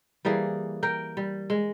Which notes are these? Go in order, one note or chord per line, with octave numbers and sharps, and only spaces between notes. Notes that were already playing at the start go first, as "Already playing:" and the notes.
E3 G3 A#3 G#4
A#4 G5
G3
G#3